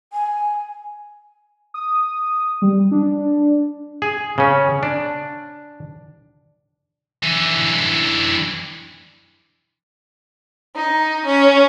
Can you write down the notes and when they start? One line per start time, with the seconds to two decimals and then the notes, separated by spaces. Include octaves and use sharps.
0.13 G#5
1.74 D#6
2.62 G3
2.92 D4
4.02 G#4
4.38 C#3 C#4
4.83 D4
7.23 D3 E3
10.75 D#4
11.26 C#4